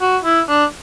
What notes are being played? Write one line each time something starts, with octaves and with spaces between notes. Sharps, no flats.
F#4
E4
D4